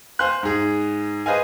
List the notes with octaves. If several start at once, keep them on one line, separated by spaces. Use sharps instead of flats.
C5 F5 G#5 C6 F#6
G#2 G#4
G#4 B4 C5 D#5 F5 G#5